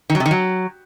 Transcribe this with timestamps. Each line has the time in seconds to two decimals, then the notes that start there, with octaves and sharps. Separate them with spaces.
0.10 D#3
0.15 F#3
0.20 C3
0.26 D#3
0.31 F#3